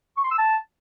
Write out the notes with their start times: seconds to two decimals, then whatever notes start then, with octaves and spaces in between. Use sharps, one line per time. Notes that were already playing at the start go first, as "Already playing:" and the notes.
0.17 C#6
0.24 C6
0.31 E6
0.38 A5